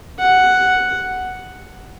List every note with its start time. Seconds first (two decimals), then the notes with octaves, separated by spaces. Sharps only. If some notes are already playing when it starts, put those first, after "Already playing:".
0.19 F#5